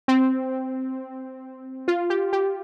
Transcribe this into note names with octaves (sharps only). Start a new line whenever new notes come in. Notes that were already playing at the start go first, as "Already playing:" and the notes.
C4
F4
G4
G4